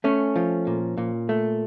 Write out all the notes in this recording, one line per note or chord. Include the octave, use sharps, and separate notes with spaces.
A3 C#4
F3
A#2
A#2
A3